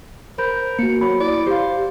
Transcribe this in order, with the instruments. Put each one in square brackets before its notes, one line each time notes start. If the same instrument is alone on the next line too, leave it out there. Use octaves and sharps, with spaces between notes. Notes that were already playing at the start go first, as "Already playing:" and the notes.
[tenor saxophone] A#4 [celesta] C5 B5 G6
[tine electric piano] A#3 F#4 [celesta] C#7
[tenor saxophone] F#3 [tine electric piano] B5
[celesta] E4 [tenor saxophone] D5
[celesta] G4 F5 [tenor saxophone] C5